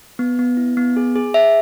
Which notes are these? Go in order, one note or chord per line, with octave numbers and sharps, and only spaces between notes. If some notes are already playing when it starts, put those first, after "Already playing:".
B3
B3
E4
B3
G#4
G#4
G#4 E5